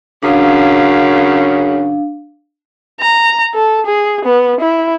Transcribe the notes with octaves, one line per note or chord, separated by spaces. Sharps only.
F#2 C#3 D4 F5
A#5
A4
G#4
B3
E4